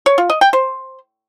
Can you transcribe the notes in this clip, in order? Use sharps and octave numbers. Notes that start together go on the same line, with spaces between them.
C#5
F4
D#5
G5
C5